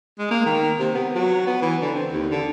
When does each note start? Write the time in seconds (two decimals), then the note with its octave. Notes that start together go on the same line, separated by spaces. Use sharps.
0.19 G#3
0.31 A#3
0.46 D#3
0.80 C3
0.95 B3
1.15 F#3
1.47 B3
1.63 E3
1.81 D3
1.95 C4
2.12 D#2
2.31 D3